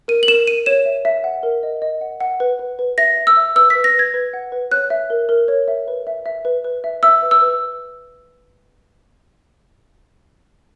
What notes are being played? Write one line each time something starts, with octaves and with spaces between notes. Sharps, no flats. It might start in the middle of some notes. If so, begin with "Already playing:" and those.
A#4 D#7
F#7
A#4 E7
A#4 D#7
C#5 E7
E5
E5
F#5
A#4
D#5
D#5
F#5
F#5
B4
B4
B4
E5 A#6
E5
E6
E5
B4 E6
B6
B4
A#6
B4
G#6
B4
F#5
B4
C#5 F#6
E5
A#4
A#4
C#5
E5
B4
E5
E5
B4
B4
E5
E5 E6
B4
E6
B4